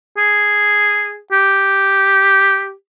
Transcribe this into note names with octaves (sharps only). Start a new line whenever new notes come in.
G#4
G4